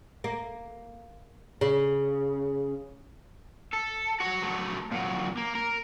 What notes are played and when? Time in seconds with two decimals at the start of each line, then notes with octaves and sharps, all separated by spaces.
0.24 A#3
1.61 C#3
3.73 A4
4.20 F#4 C#5
4.42 F#3 A3
4.92 A#2 F#3
5.37 A#3
5.55 A#4